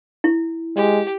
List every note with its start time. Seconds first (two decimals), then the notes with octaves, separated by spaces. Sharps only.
0.24 E4
0.76 G#3 G4